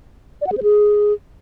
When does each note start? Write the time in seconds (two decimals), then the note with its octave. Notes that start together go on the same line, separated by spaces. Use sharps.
0.41 D5
0.47 F#5
0.52 G#4
0.57 C5
0.63 G#4